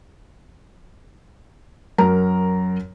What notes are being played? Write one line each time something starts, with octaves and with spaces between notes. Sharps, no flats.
F#2 A#4 A#5